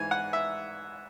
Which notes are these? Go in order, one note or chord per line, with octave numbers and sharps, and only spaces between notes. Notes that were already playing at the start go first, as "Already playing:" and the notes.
Already playing: G#2 E3 G#5
F#5
E5